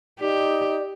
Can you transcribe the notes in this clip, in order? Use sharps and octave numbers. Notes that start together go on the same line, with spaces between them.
D#4 G4 D5